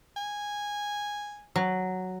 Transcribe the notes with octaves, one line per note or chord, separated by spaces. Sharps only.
G#5
F#3